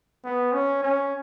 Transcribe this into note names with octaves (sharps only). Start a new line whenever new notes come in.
B3
C#4
C#4